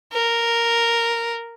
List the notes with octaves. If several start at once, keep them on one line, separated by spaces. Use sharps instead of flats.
A#4